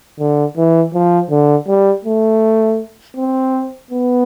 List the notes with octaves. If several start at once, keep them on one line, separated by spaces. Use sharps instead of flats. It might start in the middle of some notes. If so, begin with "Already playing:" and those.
D3
E3
F3
D3
G3
A3
C4
B3